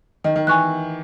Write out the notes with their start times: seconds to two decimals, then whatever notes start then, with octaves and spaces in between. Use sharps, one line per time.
0.24 D#3 D#5
0.36 D#3
0.47 E3 G#5 C#6 F#6